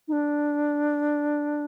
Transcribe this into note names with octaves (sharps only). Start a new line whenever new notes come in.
D#4
D4